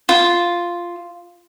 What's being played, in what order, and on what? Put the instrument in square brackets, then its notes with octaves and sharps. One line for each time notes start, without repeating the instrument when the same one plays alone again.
[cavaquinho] F4